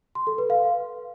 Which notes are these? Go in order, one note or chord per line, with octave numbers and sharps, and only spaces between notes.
C6
A4
B4
F5